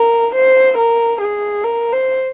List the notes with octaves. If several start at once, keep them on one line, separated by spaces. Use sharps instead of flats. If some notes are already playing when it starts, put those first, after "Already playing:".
Already playing: A#4
C5
A#4
G#4
A#4
C5